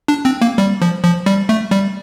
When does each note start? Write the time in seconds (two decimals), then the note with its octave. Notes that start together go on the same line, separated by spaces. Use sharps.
0.08 D4
0.25 C4
0.42 A#3
0.58 G3
0.82 F3
1.04 F3
1.26 G3
1.49 A3
1.71 G3